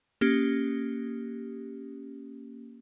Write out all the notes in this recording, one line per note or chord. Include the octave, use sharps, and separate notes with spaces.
A#3 C#4 G4